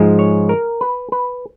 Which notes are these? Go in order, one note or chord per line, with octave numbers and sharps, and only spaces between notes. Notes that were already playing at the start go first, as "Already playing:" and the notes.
Already playing: G#2 F3 G#3
C#5
A#4
B4
B4